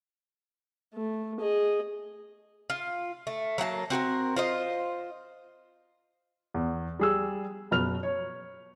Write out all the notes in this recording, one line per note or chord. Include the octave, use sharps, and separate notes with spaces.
A3
G#4 D#5
F4
A3
F#3 A#3 F#5 A5
C4 F#4 A4 A#4
F4 C5 D#5
E2
G3 G#4 E6
F#1 B2 B4 F6 F7
C#5